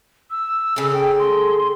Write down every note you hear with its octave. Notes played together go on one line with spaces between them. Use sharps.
E6
C#3 A4
G5
C6